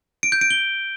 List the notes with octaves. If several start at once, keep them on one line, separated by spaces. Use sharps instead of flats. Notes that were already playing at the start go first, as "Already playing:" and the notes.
D7
G6
D7
G7